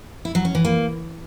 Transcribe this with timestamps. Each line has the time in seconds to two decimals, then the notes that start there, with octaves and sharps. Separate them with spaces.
0.25 E4
0.35 F#3
0.45 C#4
0.55 E3
0.65 A#3